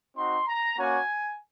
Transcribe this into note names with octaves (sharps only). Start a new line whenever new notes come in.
C4 D#4 F#4 C6
A#5
A#3 C#4 F#4 G#5